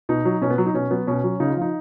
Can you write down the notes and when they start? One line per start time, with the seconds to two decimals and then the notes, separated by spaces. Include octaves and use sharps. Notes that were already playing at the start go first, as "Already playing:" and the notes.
0.09 B2 D#4
0.25 F#3
0.41 B2 C#4
0.50 B3
0.58 F#3
0.66 D#4
0.74 B2 C#4
0.91 F#3 B3
1.07 B2 C#4
1.24 F#3
1.40 C#3 D#4
1.50 F4
1.57 F3 D#4